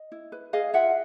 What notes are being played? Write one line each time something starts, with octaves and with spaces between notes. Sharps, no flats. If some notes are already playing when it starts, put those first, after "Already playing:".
Already playing: D#5
E4
B4
G#4 D#5 F5
F4 E5 F#5